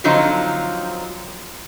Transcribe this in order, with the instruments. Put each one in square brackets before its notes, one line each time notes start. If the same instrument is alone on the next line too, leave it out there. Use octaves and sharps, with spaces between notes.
[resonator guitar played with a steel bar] D3 F3 F#3 C4 D#4 F4